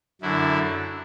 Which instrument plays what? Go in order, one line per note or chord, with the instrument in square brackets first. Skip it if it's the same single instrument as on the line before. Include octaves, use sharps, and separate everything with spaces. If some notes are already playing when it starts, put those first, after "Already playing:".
[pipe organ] F#2 D3 E4